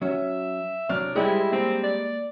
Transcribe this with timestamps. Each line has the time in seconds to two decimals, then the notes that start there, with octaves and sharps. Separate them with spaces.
0.02 F#3 C#4 F#4 E5
0.89 C2 F#3 C4 D4 F6
1.16 G3 G#3 E4 G4 G#4 C5 D#5
1.52 A#3 C4 A#5
1.84 D5